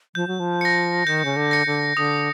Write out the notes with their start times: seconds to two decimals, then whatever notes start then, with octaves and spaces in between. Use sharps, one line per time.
0.15 F3 G6
0.28 F#3
0.40 F3
0.61 A#6 C#7
1.07 D#3 G6
1.25 C#3
1.36 D3
1.51 A#6 C#7
1.67 D3
1.97 D3 D#6